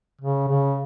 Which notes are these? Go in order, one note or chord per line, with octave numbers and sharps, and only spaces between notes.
C#3
C#3